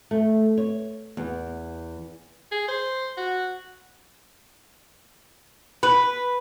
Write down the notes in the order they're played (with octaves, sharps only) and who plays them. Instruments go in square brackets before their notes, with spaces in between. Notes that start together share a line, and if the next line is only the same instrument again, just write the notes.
[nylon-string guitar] A3
C#5
E2
[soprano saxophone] G#4
C5
F#4
[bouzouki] B4